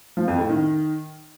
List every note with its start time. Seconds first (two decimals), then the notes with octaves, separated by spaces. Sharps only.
0.17 F3
0.28 F2
0.39 A2
0.49 D#3